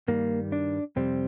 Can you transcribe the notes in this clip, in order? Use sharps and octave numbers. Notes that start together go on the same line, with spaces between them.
G2 D#3 G3 A#3
D4
F2 C3 G3 C4